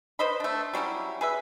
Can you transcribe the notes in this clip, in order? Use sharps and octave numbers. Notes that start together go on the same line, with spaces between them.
B4 C5 D#5 B5
A3 D4
F#3 G3 C#4 E4
G#4 B4 E5